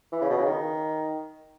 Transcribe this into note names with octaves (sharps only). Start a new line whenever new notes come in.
E3
C#3
B2
C#3
D#3